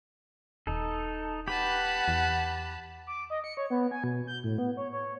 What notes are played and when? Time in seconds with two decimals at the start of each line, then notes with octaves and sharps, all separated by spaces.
0.67 D#1 D#4 A4
1.48 G4 B4 F#5 A5 B5
2.08 E2
3.07 D6
3.30 D#5
3.44 C#7
3.57 C#5
3.70 B3
3.91 G#5
4.04 B2
4.27 G6
4.44 A2
4.58 B3
4.77 C#5
4.92 C#5